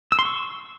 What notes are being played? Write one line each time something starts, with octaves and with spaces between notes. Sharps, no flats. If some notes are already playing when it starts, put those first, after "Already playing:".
E6
C6
C#6